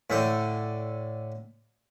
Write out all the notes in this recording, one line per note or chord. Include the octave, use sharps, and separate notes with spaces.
A2 D3 G5